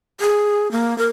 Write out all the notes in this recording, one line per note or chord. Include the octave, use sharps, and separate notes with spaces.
G#4
A#3
A#4